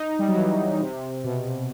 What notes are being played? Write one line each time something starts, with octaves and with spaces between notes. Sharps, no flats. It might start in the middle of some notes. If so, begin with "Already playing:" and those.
Already playing: D#4
G3
F#3
E3
C3
B2